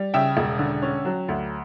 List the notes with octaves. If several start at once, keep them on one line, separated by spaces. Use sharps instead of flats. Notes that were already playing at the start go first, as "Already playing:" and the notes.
Already playing: G3
C#3 E5 G5
E1
D3
C#4
F#3
D2